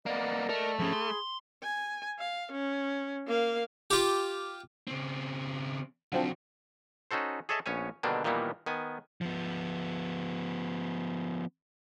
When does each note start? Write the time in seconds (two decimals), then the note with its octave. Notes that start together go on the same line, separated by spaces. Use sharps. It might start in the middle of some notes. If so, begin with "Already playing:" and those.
0.06 A#3 B3 D5 D#5
0.49 A3 A#4
0.79 F3 C#4 G#4 B5
0.93 C6
1.63 G#5
2.19 F5
2.52 C#4
3.27 A#3 F5
3.90 F4 G4
4.87 C#3 C4
6.12 B1 D3 F3 F#3 C4
7.11 C#4 D#4 F#4 A4 C5
7.49 G#4 A4 C#5 D#5 E5 A5
7.66 A#1 B3 C#4 C#5 G#5
8.03 B2 D3 D#3 G3 A#3 D4
8.24 A#2 D#3 E3 G3 A#3 B3
8.66 D#3 B3 G#5
9.21 F3 B3